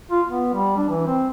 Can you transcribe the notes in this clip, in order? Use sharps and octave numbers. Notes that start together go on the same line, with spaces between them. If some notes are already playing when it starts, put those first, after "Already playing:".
F4
B3
G3
D4
E3
C4